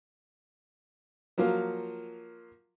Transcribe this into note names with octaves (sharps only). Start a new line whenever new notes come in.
F3 F#3 A#3 F4